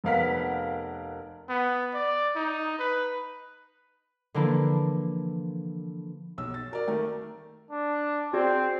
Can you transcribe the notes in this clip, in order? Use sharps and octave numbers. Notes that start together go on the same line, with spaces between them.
F1 B3 A#4 F5 F#5 B6
B3
D5
D#4
B4
D3 E3 F3 A#3 D4 E4
B1 E6
A6
F#4 A#4 D5
D#3 A3 A#4
D4
C4 F#4 G#4 D5